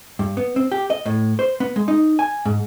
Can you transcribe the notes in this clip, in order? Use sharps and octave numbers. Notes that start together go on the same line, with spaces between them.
G2
B3
C4
G4
D#5
A2
C5
B3
G#3
D#4
G#5
G#2